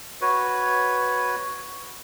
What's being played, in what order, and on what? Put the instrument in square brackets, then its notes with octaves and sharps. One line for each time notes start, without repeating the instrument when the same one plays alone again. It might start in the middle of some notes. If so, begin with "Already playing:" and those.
[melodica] F#4 B4 C#5